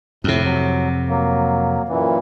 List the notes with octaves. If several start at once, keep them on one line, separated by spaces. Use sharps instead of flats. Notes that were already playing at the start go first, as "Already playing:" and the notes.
F2 A2 C3
F#3
F#3 A#3
F#2 A#2 E3